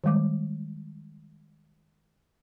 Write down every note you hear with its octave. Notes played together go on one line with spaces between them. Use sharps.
D#3 G3 G#3 D6